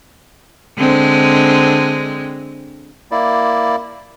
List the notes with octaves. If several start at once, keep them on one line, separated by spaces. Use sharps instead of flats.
D3 G#3 C4
A#3 E4 D5